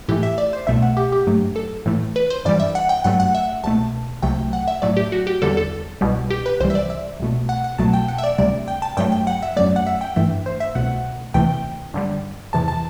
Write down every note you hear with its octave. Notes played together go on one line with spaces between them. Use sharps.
A2 E3 A3 G4
E5
D5
C5
C2 B2 A3 E5
F#5
G4
G4
G2 F#3 A3
A4
A2 E3 A3
B4
C5
G2 E3 G3 D5
E5
F#5
G5
G2 F#3 A3 F#5
F#5
E5
C2 B2 A3 A5
C2 C3 F#3 A3 G5
F#5
E5
A2 F#3 A3 D5
G4
F#4
G4
E2 D3 G3 A4
A4
C2 B2 G3
G4
B4
C2 C3 E3 G3 C5
E5
D5
E5
C2 B2 A3
F#5
F#5
C2 B2 F#3 A3 A5
G5
F#5
E5
D5
D2 C3 G3 D5
G5
A5
G2 F#3 A3 G5
G5
F#5
E5
F#2 F#3 A3 D5
F#5
E5
G5
G2 E3 A3 E5
C5
E5
C2 B2 A3 F#5
D2 C3 E3 A3 G5
G2 D3 G3
E2 C3 E3 A5
A5